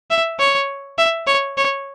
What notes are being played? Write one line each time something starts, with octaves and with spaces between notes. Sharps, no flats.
E5
C#5
E5
C#5
C#5